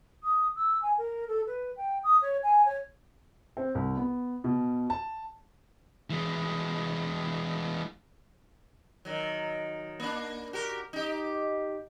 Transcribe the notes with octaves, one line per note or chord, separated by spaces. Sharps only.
D#6
E6
G#5
A#4
A4
B4
G5
D#6
C#5
G#5
C#5
C4
C2
B3
B2
A5
E3 G#3
D#3 F#3
A#3 D4
F#4 G4 A#4
D#4 G4